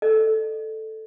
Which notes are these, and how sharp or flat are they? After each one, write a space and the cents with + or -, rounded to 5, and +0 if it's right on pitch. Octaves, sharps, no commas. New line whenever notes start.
A4 +0 D#5 -45